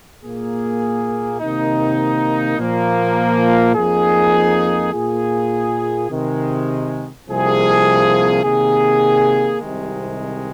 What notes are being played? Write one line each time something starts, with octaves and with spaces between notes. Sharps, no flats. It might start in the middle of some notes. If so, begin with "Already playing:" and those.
A#2 A#3 G#4
C3 D#3 A#3 D#4
A#2 F3 A#3
F2 F3 A#3 D#4 G#4
A#2 A#3 F4 G#4
C3 D#3 G#3
C2 C3 F3 A#3 G#4
C3 D#3 A#3 G#4
C2 C3 D#3 G#3